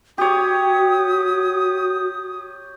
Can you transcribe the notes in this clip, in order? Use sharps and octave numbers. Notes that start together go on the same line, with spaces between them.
F#4 G4 C#5 D#6